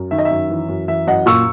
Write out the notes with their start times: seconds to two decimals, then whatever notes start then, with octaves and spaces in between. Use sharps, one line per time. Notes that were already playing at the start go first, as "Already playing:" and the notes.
Already playing: F#2
0.11 D#3 E5
0.18 D#5
0.25 E5
0.31 F#2
0.50 E3
0.68 F#2
0.88 E3 E5
1.07 F#2 D#5 F#5
1.26 A#2 C#6 E6